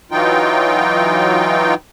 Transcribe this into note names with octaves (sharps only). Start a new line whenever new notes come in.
E3 F#3 D#4 F4 G5